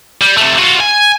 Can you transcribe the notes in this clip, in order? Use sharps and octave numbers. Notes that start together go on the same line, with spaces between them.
G3
C3 A3
F4 F#4
G#5